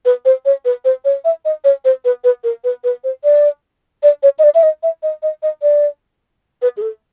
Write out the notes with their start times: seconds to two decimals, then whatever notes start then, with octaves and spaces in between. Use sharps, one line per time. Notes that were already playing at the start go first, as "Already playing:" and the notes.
0.05 B4
0.25 C5
0.45 C#5
0.65 B4
0.85 C5
1.05 C#5
1.25 E5
1.45 D#5
1.64 C#5
1.85 C5
2.05 B4
2.24 B4
2.44 A#4
2.64 B4
2.84 B4
3.04 C5
3.24 D5
4.03 D5
4.23 C#5
4.39 D#5
4.43 D5
4.55 E5
4.63 D#5
4.83 E5
5.03 D#5
5.23 D#5
5.43 D#5
5.62 D5
6.62 B4
6.77 G#4
6.82 A4